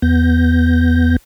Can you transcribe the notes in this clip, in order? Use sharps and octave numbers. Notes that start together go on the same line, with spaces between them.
E2 B3 G6 A#6